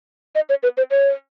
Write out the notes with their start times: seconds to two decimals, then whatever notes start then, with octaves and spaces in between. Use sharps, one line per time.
0.35 D#5
0.49 C#5
0.63 B4
0.77 C5
0.91 C#5